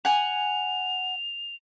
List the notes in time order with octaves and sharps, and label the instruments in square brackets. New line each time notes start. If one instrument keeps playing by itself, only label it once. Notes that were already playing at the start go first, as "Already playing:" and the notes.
[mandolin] F#5 G#5 [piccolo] F7